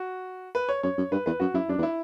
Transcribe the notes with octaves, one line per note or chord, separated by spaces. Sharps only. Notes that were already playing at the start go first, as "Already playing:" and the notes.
Already playing: F#4
B4
C#5
F#2 C#5
F#2
G2 B4
E2 B4
F#2 F#4
F#2 E4
F#2 D4
E2
E4